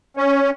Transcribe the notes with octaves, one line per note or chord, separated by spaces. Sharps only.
C#4